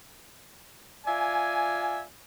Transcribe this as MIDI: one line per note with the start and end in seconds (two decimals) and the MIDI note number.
1.05 2.01 65
1.05 2.01 74
1.05 2.01 76
1.05 2.01 80